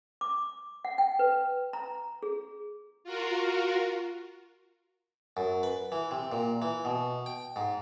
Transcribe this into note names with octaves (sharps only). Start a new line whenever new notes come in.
D6
F#5
G5
B4
A#5
G#4
F4 F#4 A#4
F#2
B4
E3
C3
A#2
E3
B2
G5
G#2